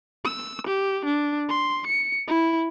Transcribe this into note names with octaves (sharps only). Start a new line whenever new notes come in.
E6
G4
D4
C6
C#7
E4